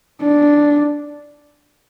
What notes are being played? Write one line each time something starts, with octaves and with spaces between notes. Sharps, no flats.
D4